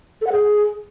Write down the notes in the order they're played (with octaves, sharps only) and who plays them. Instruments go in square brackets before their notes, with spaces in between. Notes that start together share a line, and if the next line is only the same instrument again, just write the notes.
[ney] A4
F#5
G#4